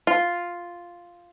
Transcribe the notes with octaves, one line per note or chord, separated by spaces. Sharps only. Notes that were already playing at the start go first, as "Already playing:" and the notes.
F4